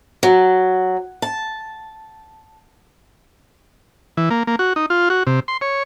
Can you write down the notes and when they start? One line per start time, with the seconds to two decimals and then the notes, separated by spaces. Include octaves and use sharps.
0.23 F#3
1.22 A5
4.17 E3
4.31 A#3
4.47 A#3
4.59 F#4
4.76 D#4
4.90 F4
5.10 F#4
5.27 C3
5.48 C6
5.61 C#5